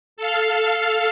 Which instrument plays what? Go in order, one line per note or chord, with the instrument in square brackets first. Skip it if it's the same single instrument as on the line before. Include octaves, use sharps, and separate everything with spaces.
[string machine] A4 F5